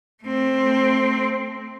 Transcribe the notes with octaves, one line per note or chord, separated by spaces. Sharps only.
A3 C4